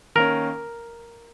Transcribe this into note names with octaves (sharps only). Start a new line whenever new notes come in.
D#3 A#3 C#4 A#4